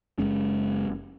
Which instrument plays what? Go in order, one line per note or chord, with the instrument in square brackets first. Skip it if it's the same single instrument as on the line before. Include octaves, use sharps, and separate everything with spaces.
[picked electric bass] F#1 G#3 C#4